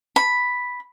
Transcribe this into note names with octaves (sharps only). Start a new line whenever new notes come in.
B5